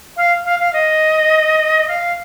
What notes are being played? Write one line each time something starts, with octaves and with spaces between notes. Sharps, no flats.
F5
F5
F5
D#5
F5